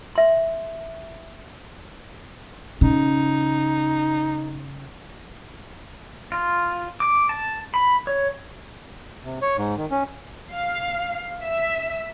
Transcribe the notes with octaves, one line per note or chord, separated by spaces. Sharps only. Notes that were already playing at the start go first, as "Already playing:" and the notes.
E5 C6
C#3 D#4
F4
D6
A5
B5
C#5
C3
C#5
G#2
D#3
C#4
F5
E5